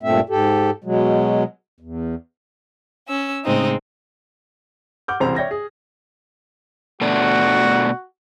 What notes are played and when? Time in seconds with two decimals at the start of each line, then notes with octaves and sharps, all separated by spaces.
0.03 G2 A#2 A3 C4 E5
0.30 G#2 G4 A4
0.84 B2 F#3 G#3
1.80 E2
3.07 C#4 E6
3.44 A2 C#3 G#3 C4 D#4
5.08 F#5 D6 F6 G6
5.20 E1 C2 C4 C5 A#5 F7
5.36 C#5 D5 E5 G5 G#6 A#6
5.51 G#4
7.01 B2 A3 D4 F#4